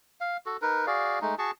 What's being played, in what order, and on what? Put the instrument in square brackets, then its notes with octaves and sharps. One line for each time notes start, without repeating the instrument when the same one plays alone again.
[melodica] F5
F#4 A4
D#4 A#4 B4
F#4 G#4 D5 F5
G#3 A3 D#4
F#4 G#4 A5 C#6